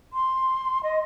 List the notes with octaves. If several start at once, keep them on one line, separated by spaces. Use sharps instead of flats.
C6
D#5